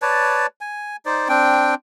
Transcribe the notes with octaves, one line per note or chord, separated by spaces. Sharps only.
B4 C#5 D5 A5
G#5
D#4 C5 D5
C4 D4 G5